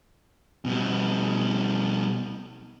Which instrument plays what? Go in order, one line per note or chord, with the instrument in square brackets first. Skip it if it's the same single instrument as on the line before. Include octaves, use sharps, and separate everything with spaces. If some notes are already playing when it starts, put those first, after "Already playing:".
[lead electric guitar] B2 G3